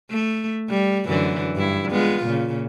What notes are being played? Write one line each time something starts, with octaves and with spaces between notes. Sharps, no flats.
A3
G3
F#2 D3 E3
G2 E4
G#3 B3 F4
A#2 C#3